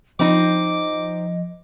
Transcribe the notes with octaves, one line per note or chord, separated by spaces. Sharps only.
F3 C4 D#4 D#5 D6